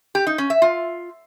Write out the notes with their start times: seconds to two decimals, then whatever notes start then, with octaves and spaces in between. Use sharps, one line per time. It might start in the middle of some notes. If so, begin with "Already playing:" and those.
0.15 G4
0.27 D#4
0.38 C#4
0.50 E5
0.62 F4